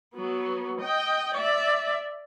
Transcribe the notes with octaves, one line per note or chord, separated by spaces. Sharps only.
F#3 B3
D#5 G5
D5 E5